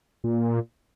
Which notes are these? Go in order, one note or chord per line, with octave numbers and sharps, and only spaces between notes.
A#2